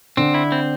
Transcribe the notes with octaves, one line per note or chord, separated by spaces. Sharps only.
D3 C4 D4
E4
C4